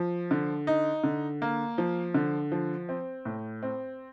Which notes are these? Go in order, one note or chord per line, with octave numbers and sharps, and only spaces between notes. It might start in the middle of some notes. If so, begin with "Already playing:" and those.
Already playing: F3
D3
D#4
D3
A#3
F3
D3
F3
C4
A2
C4